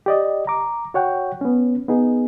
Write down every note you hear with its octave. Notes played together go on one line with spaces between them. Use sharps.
G4 D5 D#5
A#5 D6
F#4 C#5 F#5 G5
B3 C#4
B3 D#4 G#4